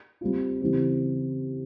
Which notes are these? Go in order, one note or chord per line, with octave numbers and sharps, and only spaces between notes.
G3 C4 F4
C#3 E3 G3 C4 G4